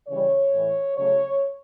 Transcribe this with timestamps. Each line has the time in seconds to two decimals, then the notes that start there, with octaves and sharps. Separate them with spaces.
0.08 C#3 E3 G3 C#5
0.52 A2 E3 A3
0.96 C#3 F#3 A3 C#5